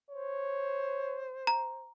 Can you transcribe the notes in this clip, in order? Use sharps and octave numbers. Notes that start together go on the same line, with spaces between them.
C5 C#5
A#5